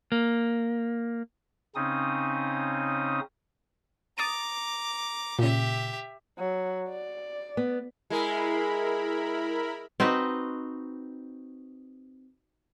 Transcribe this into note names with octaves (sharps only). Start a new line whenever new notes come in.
A#3
C#3 C4 C#4 D#4 D#6
A#5 D6 D#6 A6 D7
A#2 C#3 G4 E5
F#3
D5
B3
G#3 E4 A#4 B5
C4 D#4 F#4 B4